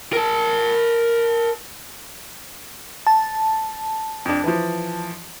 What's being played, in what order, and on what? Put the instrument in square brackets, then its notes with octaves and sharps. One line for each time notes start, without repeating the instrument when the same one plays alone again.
[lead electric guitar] A#4 A5
[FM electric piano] A5
[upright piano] F2 D4
E3 F3